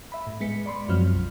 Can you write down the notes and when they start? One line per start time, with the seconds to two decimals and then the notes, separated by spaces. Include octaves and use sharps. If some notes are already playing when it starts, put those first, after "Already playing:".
0.12 E5 B5
0.27 A2
0.40 G#3 B3 B6 C#7
0.66 D5 B5 C6
0.89 F#2 F3 F#3 C4 F6
1.13 B1